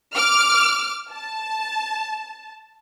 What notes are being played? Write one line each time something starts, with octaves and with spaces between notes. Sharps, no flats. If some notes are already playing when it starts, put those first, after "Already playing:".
D6 F6
A5